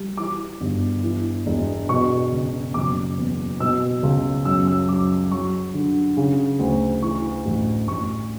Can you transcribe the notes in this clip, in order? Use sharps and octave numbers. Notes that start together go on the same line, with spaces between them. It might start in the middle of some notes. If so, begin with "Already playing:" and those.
Already playing: G3
E3 D6
G1
E3
E1
B2 C#6
C#2
F#1 D6
E2
B2 E6
C#2
F#2 E6
E6
F#2 D6
F#3 C#6
D3
C#3
D2
E3 C#6
A1
A1 C#6